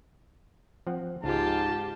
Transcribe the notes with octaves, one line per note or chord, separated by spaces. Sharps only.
F3 C4 F#5
C#2 G#2 F4 G4 A5